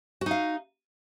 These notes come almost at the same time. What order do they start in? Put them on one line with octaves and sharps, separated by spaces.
F#4 D#4 F5